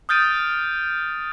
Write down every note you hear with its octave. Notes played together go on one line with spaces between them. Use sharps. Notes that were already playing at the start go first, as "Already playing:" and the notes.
D#6 F6 G6 A6 D7 D#7